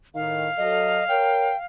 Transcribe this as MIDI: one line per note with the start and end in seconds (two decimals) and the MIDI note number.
0.15 0.47 45
0.15 0.47 51
0.15 0.47 63
0.15 1.66 77
0.57 1.00 54
0.57 1.00 69
0.57 1.05 75
1.08 1.50 70
1.08 1.50 73
1.08 1.56 79